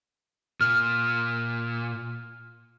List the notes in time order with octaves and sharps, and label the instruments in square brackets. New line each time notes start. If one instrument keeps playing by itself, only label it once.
[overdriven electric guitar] A#2 [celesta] F6